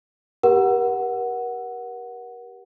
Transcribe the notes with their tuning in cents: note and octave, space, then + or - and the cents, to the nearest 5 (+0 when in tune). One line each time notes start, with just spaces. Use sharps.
G4 +0 A#4 +35 F#5 +0